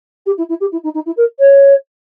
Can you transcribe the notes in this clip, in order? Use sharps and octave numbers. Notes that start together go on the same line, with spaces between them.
G4
E4
E4
G4
E4
D#4
D#4
E4
A#4
C#5